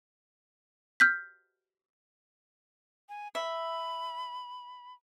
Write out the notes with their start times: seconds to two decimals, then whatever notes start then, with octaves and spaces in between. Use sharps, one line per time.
1.00 F6 G6 B6
3.09 G#5
3.35 E5 B5